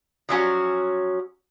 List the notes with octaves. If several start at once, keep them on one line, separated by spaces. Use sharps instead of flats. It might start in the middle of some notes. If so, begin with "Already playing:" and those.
F3 F#3 C#4 F#4